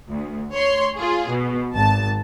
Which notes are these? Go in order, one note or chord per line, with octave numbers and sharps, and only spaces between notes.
D2
C#5 C6
F4 G#4
B2
G#1 A5